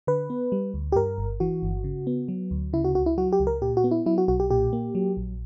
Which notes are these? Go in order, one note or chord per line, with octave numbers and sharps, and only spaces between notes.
D3 B4
B3
G3
D2
G4
G2 A#4
G1
E3 F#4
G1
C#3
B3
F#3
D2
C#3 E4
F#4
C#2 F#4
E4
F#3 F#4
G4
C#2
A#4
A#2 G4
F#4
B3
E4
F#3 E4
F#4
B1 F#4
G4
A#2 G4
A#3
F#3
A#1